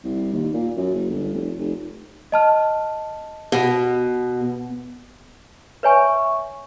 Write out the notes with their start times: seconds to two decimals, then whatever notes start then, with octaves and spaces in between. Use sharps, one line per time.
0.04 C2
0.33 D#2
0.54 A#2
0.77 F#2
0.94 F#1
1.10 G1
1.33 F1
1.58 F1
2.32 D#5 A5 F6
3.52 B2
5.83 B4 C#5 E5 G#5 C#6